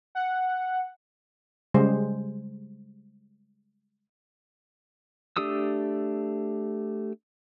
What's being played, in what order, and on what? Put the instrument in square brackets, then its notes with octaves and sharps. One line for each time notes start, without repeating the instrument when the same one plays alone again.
[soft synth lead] F#5
[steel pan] C#3 G3 G#3 C5
[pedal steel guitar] A3 D4 G4 D#6 E6